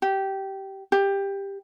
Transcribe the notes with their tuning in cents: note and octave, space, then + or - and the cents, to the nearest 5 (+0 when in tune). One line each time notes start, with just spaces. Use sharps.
G4 -15
G4 +15